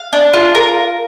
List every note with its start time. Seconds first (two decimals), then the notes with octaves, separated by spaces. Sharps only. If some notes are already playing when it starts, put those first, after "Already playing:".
Already playing: F5
0.13 D4
0.33 F4
0.55 A#4